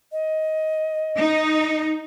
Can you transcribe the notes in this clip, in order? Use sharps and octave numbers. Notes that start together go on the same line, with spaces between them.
D#5
D#4